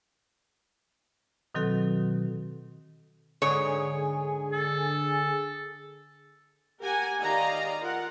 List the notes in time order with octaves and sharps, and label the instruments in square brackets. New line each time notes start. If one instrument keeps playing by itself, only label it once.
[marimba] B2 D#3 F#3 C4 F#4 A4
[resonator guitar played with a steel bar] G#2 C#5 [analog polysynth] D3 G#4
[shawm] A4
[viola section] G4 A#4 F#5 G#5
D#3 G4 D5 D#5 F5 A#5
F4 A#4 F#5